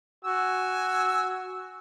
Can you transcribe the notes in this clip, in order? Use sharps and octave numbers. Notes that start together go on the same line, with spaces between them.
F#4 G#5 E6